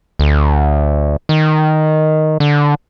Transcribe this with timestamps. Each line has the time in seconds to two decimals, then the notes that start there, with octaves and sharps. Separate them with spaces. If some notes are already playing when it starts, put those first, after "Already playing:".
0.19 D2
1.29 D#3
2.40 D3